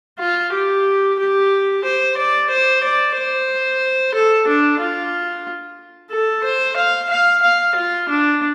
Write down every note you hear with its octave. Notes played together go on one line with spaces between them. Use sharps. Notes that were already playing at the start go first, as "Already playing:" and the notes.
F4
G4
G4
C5
D5
C5
D5
C5
A4
D4
F4
A4
C5
F5
F5
F5
F4
D4